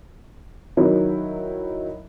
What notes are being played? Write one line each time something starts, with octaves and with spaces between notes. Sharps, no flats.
D#3 F#3 E4